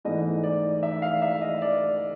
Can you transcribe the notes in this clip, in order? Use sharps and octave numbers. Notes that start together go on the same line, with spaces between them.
G#2 E3 A3 D#5
D5
E5
F5
E5
D#5
D5